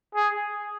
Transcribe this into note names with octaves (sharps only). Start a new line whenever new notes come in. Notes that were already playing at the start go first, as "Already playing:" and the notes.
G#4